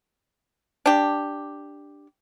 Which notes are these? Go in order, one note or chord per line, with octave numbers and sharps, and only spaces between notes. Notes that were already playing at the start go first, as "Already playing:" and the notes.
D4 G4